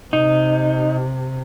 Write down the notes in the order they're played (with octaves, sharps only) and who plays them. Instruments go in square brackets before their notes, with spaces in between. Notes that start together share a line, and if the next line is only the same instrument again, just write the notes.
[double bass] C3 [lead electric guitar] D#4